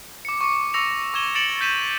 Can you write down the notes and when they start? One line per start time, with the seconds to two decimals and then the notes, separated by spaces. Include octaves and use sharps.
0.25 D6 C#7
0.41 C#6 D6 C#7
0.74 C#6 D6 E6 A#6 C#7 F7
1.14 C#6 D6 G#6 E7 G7
1.35 A6 C#7 D7 E7 F#7
1.61 G6 A6 B6 D#7 E7